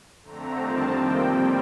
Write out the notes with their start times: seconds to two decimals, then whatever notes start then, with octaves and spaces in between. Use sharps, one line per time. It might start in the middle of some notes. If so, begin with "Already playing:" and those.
0.24 F2 D3 A3 C4 A#5
0.57 F2 D#3 G3 C4 A5
0.88 C3 F3 A#3 G5
1.22 A2 G3 C4